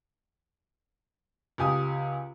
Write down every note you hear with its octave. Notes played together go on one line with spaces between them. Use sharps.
C#2 G4 G#5 D#6